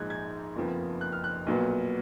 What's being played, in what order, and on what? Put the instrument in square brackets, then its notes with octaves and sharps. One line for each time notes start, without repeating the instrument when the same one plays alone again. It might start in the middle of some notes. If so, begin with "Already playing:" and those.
Already playing: [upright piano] A#1 G#2 F3 G#3 D#4 F#6 G#6
G#6
F#1 F2 F3 B3
F#6
F6
F#6
B1 A#2 F#3 B3